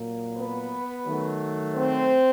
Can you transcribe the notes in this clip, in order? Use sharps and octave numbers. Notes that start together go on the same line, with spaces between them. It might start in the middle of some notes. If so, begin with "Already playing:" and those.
Already playing: A#2 F#3 A#3
B3 B4
D#3 F#3 A3
C4 C5